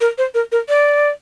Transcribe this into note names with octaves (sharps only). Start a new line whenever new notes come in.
A#4
C5
A#4
A#4
D5